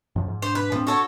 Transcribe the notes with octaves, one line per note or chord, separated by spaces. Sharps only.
F#2 F3
G#2
D4 C5
B4
A2 F3 C4
F#4 A4 C#5